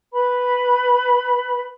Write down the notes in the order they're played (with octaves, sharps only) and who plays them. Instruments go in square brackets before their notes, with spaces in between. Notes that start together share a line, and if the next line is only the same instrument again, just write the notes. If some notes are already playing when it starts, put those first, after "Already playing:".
[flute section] B4 B5